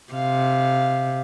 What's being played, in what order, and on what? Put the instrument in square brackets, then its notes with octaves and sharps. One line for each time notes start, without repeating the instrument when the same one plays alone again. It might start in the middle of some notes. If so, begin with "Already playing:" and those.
[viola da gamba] C3 [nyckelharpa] F5